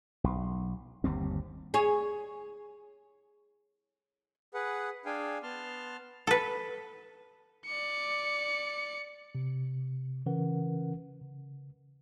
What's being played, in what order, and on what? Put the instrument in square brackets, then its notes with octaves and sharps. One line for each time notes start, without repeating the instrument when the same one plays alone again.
[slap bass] B1
G1 D#2 G3 C4
[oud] G#4 C#5
[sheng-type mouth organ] G#4 B4 F#5
D4 G#4 F5 G5 G#5
B3 A5 C6 F6
[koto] A4 B4
[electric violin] D5 C#7
[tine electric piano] C3
C#3 E3 C#4 A#4 B4 F#5
C#3